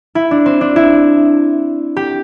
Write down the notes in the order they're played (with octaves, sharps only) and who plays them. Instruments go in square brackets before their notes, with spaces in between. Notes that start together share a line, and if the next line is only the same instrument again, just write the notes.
[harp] E4
D4
C4
D4
E4
G4